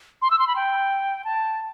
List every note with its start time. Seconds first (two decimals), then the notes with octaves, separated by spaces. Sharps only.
0.22 C6
0.31 E6
0.39 C6
0.47 B5
0.56 G5
1.25 A5